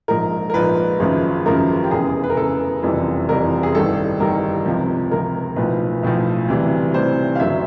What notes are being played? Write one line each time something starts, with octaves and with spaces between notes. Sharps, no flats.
A#1 G#2 F3 A#4
A#4
A#1 G#2 F3 B4
G#1 F#2 C#3 F3
G#1 F#2 C#3 F3 A#4
G4
F1 E2 C#3 G#4
B4
A#4
F1 E2 C#3 A4
F#1 F2 C3 E3 G3
F#1 F2 C3 E3 G3 A#4
G#4
A1 G2 D#3 G3 A4
A1 G2 D#3 G3 A#4
C#2 C3 F3
C#2 C3 F3 A#4
B1 A2 F3 B4
B1 A2 F3
D2 C3 E3 G3
D2 C3 E3 G3 C5
F5
F#1 F#2 D3 F#3 E5